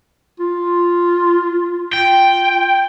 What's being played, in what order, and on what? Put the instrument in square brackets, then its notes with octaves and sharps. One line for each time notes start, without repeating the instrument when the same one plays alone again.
[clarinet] F4
[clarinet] F4 [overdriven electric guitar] G5